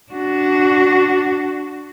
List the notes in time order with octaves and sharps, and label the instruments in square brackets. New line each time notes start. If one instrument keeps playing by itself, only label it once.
[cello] D4 F#4